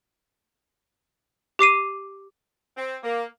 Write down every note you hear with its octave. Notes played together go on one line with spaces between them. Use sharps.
G4 D6 C7 D#7
C4
A#3